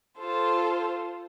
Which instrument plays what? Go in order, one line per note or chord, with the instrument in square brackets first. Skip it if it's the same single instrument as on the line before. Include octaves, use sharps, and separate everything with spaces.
[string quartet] F4 A4 C5